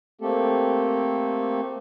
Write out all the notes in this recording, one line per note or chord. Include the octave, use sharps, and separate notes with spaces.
A3 A#3 C4 G4 A4